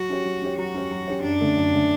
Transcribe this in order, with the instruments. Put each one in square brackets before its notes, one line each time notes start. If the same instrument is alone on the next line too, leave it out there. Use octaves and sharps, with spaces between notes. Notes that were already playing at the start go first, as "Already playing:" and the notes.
Already playing: [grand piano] F#3 [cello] F#4
[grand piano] C#4 G4 C#5
F#3
C#4 G4 C#5
[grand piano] F#3 [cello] F#4
[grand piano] C#4 G4 C#5
F#3
C#4 G4 C#5
[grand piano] F#2 [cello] D4
[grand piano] D3 A3 C#4
F#2
D3 A3 C#4